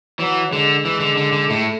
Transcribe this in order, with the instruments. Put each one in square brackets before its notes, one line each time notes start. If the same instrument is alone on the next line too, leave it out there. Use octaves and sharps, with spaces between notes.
[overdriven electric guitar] E3 [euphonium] F#3
[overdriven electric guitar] D3 [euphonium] G#3
[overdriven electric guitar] E3
D3
D3
D3
[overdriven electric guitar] A2 [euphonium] A3